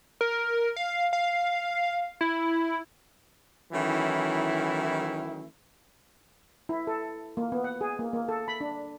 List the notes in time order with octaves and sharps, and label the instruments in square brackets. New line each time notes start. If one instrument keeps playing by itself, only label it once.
[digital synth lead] A#4
F5
F5
E4
[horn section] D#3 E3 F#3 A3 C#4 E4
[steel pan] E4
A4
A#3
B3
F#5
G#4
A#3
A#3
A4
B5
D4